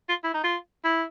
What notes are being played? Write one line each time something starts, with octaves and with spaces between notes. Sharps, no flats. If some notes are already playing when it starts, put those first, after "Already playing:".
F4
E4
D#4
F4
E4